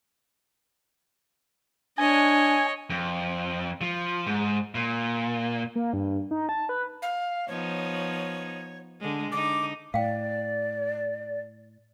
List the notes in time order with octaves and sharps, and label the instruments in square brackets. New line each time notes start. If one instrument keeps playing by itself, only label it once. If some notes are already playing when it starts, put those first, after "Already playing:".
[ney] D4 [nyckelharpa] C#5 D#5 [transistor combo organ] G#5
[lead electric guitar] F2
F3
G#2
A#2
[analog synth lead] A#3
G2
D#4
A5
B4
[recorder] F5
[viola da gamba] F3 B3 D#4 [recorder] C#5
[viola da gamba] D3 G#3
[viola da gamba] D3 D#4 [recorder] D6
[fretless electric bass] A2 [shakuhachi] D5 [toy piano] F5 G5